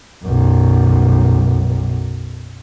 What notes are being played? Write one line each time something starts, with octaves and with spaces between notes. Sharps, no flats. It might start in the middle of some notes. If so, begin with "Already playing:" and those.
B1 F#2